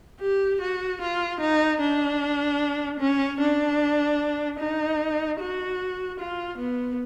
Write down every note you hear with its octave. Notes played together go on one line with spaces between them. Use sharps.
G4
F#4
F4
D#4
D4
C#4
D4
D#4
F#4
F4
B3